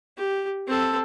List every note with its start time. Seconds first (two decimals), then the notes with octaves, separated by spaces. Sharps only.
0.18 G4
0.67 C4 A4